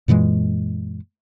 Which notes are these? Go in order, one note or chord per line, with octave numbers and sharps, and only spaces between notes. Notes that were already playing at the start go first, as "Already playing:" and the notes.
F#2 A#2 E3 G#3